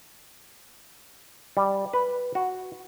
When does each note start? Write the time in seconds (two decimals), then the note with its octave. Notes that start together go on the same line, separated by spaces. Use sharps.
1.57 G3
1.93 B4
2.35 F#4